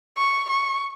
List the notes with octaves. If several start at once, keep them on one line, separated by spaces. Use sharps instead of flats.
C#6
C#6